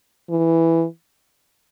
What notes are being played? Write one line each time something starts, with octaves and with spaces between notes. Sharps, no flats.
E3